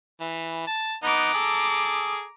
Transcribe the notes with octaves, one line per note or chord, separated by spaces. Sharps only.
E3
A5
B3 D#4 A#5 D6
G#4 A4